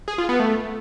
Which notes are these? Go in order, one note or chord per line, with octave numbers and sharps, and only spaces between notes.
G#4
F4
B3
A3